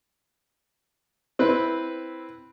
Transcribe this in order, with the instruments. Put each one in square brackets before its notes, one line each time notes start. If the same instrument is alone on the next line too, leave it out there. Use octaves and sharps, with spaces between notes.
[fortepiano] C4 E4 B4